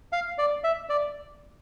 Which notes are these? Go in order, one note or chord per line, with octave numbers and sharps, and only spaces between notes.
F5
D5
E5
D5